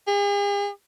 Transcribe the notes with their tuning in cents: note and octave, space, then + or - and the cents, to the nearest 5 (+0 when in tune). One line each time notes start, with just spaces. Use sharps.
G#4 -45